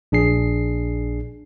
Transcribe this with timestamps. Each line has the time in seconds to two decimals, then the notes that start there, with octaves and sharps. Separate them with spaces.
0.12 A#1 D4 G#4 C7